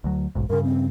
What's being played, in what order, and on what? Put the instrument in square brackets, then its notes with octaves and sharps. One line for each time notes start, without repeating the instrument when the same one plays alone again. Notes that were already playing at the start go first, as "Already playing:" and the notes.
[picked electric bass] D2 F#3
F#1 B1 G#2
[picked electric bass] G2 C#3 [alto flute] A#4
[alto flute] C4